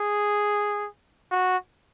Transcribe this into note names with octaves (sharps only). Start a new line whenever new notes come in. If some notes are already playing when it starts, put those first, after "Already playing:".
Already playing: G#4
F#4